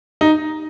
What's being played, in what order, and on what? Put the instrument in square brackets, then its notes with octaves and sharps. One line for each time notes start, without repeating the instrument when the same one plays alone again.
[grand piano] D#4